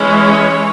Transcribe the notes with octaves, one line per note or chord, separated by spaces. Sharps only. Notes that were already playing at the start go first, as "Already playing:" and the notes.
Already playing: E3 G#3 C#4
C#5